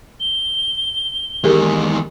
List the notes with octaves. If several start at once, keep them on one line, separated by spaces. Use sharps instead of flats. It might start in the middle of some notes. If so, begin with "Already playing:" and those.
G7
E2 D#3 G#3 G4 G#4 A#4